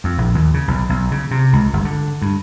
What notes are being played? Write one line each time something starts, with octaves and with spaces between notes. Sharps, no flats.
F2
A#1
D#2
C#3
B1
B1
C#3
C3
C#2
G1
D3
G2